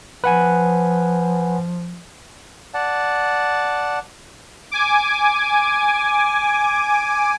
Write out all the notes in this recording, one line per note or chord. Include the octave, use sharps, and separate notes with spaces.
F3 B4 F#5 G#5
D5 F#5 A5
G#5 D6